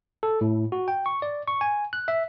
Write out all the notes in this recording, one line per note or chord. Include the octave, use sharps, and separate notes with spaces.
A4
A2
F#4
G5
C#6
D5
C#6
G#5
F#6
E5